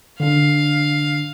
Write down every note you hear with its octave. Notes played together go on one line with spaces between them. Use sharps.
D3 D4 F5